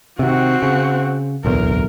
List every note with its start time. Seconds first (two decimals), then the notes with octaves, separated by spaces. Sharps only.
0.19 C3 D#3 C4 F#4
0.62 C#3
1.45 D1 B1 E2 A#4